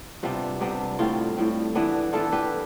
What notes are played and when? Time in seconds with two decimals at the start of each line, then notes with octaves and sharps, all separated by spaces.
0.23 C3 G3 B3 D4 F4
0.60 C3 G3 B3 D4
0.99 A2 G3 C4 F4
1.37 A2 G3 C4
1.75 E3 B3 D4
2.13 E3 B3 D4 F4 A4
2.33 G4 B4